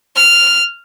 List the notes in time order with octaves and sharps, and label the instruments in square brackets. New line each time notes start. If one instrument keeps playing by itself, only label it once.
[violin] F6